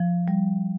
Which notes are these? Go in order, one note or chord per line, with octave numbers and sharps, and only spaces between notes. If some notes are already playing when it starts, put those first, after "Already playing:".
Already playing: F3
G3